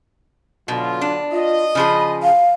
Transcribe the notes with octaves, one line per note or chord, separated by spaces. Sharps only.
B2 D3 F#3 F4
D4
F4 D#5
C#3 F3 G#4 B5
F5